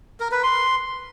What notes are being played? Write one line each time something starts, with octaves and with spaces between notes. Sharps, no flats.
A#4
B4
C6